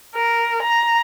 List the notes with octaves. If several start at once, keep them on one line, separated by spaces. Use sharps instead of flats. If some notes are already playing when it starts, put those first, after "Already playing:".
A#4
A#5